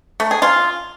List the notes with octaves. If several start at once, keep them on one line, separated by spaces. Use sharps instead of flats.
A3
G#4
F4